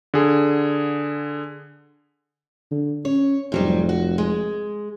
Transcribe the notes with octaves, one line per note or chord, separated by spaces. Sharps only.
D3 G#4
D3
C#4 C#5
F1 G#2 F#3 G3
F#4
G#3